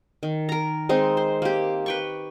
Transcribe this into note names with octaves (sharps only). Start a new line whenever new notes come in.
D#3
A#4 A#5
G#3 C4 D#4
C5
A#3 G4
B4 G5 C#6